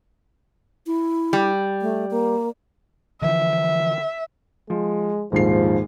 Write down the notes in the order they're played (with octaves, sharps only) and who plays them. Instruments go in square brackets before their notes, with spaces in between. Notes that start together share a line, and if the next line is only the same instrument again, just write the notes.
[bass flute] E4
[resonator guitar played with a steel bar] G3
[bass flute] A3
A#3
[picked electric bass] D3 E3 F3 [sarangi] E5
[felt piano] F3 [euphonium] G#3
[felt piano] D#1 A#1 C7 [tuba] G#2 [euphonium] F3